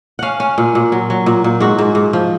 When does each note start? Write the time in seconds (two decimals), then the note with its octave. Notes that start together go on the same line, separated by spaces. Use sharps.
0.19 C#4 F5 F#5
0.40 C#4
0.58 A#2
0.75 A#2
0.92 F#3
1.10 F#3
1.26 A#2
1.44 A#2
1.60 G#2 F#4
1.78 G#2
1.95 G#2
2.13 F3